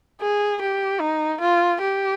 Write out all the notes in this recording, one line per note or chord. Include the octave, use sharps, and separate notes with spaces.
G#4
G4
D#4
F4
G4